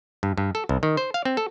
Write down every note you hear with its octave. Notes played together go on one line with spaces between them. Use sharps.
G2
G2
A4
C2
D#3
C5
F5
C4
A4